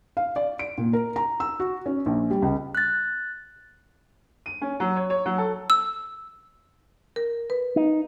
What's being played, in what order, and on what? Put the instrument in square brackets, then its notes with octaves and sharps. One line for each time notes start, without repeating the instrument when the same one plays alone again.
[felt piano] F5
D5
D7
A#2
A#4
A#5
E6
F#4
C#4
A#1
G3
C#2
[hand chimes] F#6 A6
[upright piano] D#7
C#4
F#3
C#5
C#5
F#3
A4
[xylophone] E6
[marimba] A#4
B4
[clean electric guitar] D#4